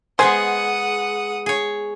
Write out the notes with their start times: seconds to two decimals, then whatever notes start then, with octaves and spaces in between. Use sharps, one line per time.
0.19 G#3 B3 G#4 C5 F#5 G#5 D#6
1.46 G#4 C#5